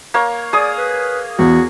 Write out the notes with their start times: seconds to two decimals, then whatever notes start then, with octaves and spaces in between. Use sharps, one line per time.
0.14 A#3 C#5
0.53 G#4 D5 D#6
0.78 B4
1.39 E2 F#4